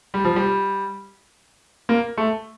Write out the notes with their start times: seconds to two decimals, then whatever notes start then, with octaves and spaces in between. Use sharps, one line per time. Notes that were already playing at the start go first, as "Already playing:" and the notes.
0.14 G3
0.25 F3
0.36 G3
1.89 A#3
2.17 A3